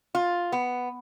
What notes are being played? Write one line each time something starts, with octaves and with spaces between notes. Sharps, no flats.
F4
B3